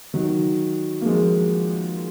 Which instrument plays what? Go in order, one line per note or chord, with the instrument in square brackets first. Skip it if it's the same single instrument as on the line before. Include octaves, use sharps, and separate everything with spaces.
[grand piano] D#3 F#3
A#3
F3 G#3